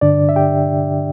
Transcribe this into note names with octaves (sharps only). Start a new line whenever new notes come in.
G2 D3 D4 D5
E5
G4 G5